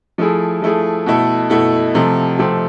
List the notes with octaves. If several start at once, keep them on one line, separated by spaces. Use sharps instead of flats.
F3 A3 E4 G#4
F3 A3 E4 G#4
B2 A3 E4 A4
B2 A3 E4 A4
C3 F3 A3 C4
C3 F3 A3 C4